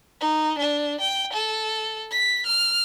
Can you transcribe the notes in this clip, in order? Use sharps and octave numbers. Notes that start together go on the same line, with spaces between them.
D#4
D4
G5
A4
B6
F6